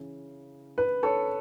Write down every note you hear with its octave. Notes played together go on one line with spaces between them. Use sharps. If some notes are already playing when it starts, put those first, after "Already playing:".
Already playing: C#3 E3 C#4
B4
A4 C#5